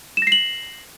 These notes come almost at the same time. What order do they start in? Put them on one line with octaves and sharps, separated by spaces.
E7 A#6 C7 F#7